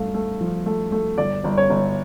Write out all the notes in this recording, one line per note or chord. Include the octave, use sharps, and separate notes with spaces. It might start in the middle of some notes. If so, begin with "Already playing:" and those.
Already playing: G2 A3 F5
A3
F3
A3
A3
G1 D5
G1
C#5
G1